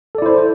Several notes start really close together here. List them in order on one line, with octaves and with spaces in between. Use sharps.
A4 D5 E4 C5